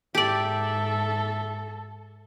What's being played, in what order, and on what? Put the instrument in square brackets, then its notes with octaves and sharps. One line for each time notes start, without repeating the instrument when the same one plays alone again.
[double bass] G#2 [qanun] G4 D5 [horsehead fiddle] A4 [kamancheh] E5